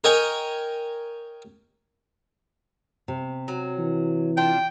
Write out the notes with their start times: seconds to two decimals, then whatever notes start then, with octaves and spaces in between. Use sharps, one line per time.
0.04 A#4 C#5 D#5 G5 G#5
3.08 C3
3.48 F#3
3.79 E3
4.37 D4 F4 G5